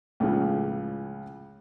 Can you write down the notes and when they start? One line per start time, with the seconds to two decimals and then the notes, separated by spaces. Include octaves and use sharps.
0.20 C#2 A2 C#3 F3